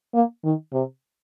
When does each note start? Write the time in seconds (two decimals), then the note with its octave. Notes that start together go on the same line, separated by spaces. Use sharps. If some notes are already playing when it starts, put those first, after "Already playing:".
0.14 A#3
0.44 D#3
0.73 C3